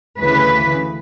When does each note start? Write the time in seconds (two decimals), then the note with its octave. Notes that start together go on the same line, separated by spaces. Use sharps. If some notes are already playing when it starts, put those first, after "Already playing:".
0.19 D2 C#3 E3 B4